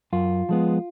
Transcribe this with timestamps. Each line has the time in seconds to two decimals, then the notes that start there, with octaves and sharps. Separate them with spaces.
0.13 F#2 F4
0.49 F3 G#3 B3